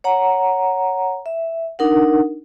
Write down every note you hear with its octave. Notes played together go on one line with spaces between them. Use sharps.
C#5 F#5 A#5
E5
D4 D#4 A#4 F#5